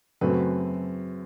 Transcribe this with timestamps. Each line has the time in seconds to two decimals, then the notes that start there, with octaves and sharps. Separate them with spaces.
0.21 F#2 C#3 F#3 A3 C4 B4